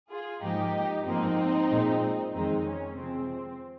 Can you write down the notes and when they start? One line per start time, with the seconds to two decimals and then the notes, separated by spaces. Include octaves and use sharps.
0.09 F4 G#4
0.42 G#2 F3 A#3 D#4 G4
1.05 G#2 F3 A#3 C4 D#4
1.70 A#2 G#3
2.32 F2 D#3 G#3 C4 D#4
2.65 C#4
2.96 C3 F3 G#3 C4